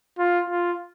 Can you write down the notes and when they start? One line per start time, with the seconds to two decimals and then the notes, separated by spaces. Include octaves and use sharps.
0.19 F4
0.50 F4